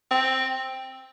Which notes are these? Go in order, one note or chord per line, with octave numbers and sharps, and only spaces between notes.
C4